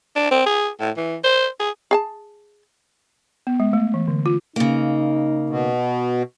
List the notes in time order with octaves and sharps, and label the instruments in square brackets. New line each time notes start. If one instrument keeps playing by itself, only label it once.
[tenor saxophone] D4
C4
G#4
A2
E3
C5
G#4
[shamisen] G#4 G#5 A5
[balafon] B3
G#3
A3
E3
D3
F4
[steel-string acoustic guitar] C#3 A#3 [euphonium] D#4
[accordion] B2